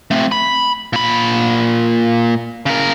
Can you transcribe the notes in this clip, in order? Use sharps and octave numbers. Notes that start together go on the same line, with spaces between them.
A3 C4
B5
A#2 B5
C#3 A#4